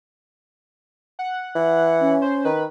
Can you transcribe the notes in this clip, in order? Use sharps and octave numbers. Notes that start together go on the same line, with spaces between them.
F#5
E3
C#4
C5
D#3 B4